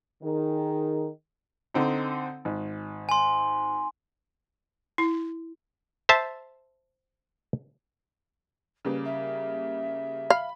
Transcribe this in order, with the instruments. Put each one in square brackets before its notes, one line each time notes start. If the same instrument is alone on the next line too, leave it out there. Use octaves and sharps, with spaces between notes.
[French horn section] D#3 G#4
[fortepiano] D3 C4 D#4
G#1
[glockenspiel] G#5 C6
[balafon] E4
[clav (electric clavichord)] C5 E5 A5
[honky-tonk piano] C#3 G3 A#3 [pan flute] B4
[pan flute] E5
[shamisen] F5 [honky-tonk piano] B5